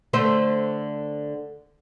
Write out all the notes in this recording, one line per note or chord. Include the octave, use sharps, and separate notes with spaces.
D3 A3 C5